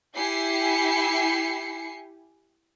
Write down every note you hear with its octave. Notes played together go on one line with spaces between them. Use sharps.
E4 G4 G#5 C7 C#7